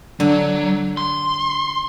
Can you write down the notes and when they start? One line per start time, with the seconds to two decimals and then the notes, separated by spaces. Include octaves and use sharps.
0.20 D3 F#3
0.97 C6